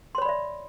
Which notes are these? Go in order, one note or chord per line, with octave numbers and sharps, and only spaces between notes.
C#5 D5 E5 B5 C6